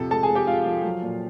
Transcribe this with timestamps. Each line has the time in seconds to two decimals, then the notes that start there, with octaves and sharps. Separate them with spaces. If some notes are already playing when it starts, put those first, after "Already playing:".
Already playing: F2 C3 F3 A4
0.11 G#3 A4 A5
0.23 G#4 G#5
0.30 G#3
0.35 G4 G5
0.47 G#3 F4 F5
0.66 F3
0.84 F#3
1.02 A#2